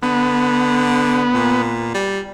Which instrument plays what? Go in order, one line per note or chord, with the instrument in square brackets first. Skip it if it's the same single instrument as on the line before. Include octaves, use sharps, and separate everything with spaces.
[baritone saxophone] D3 [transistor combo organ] B3
[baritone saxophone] A#2
G3